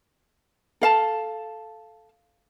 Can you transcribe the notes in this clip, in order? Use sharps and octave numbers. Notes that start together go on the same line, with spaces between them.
A4 F5 A5